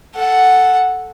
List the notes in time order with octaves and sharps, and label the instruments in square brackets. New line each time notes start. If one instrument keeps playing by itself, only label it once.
[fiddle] A4 F#5